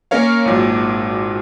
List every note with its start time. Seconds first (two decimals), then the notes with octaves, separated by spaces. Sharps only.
0.11 A#3 C#4 A#4 C#5 F5
0.45 G#1 A#2 F#3